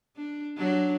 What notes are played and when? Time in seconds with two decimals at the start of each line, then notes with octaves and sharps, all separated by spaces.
0.16 D4
0.57 F#3 D4